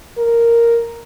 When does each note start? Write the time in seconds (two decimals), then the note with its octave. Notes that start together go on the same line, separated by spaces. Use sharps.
0.18 A#4